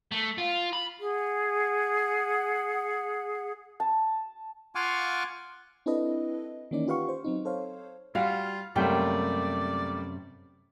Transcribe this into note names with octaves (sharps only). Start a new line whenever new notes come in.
A3
F4
B5
G#4 F#5
A5
F4 F5 F#5 G#5 C#6 D6
C4 D4 E4 A4 B4 D#5
D#3 E3 A#3 C#4 D#4 D5
F4 G4 B4 F5 F#5 C#6
C5
F#3 C4 D#4
A4 C5 C#5 F5
G3 F4 F#4 F5
F#2 C3 G3 A3 A#3 D5 G5